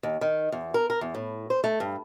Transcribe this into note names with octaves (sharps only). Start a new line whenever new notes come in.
D#2
D#3
E2
A#4
A#4
E2
A2
C5
A3
G2